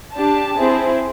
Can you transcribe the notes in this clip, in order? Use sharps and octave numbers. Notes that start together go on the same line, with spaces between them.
D4 G4 A5
C4 E4 G#4